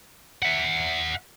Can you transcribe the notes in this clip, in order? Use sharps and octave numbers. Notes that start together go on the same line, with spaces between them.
E5 F#5